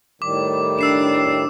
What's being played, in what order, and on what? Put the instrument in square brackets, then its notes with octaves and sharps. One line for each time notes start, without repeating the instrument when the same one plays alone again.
[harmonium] A2 D#3 G3 [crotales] D6
[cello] D4 [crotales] E6 C7 E7